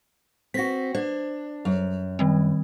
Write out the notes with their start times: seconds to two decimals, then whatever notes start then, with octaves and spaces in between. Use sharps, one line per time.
0.54 C4 F#4 A#6 B6
0.95 D4 C5
1.65 F#2
2.19 D#3 G3 C4